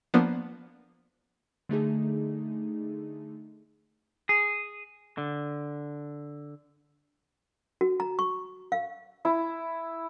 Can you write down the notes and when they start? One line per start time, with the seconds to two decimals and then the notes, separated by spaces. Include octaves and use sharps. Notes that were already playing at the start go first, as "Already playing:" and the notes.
0.14 F3 A#3 B3 D4
1.69 D3 A3 D#4 G#4
4.29 G#4
5.18 D3
7.81 F#4
8.00 A#5
8.19 C#6
8.72 F5
9.25 E4